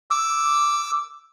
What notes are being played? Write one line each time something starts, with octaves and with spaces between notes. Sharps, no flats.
D6 E6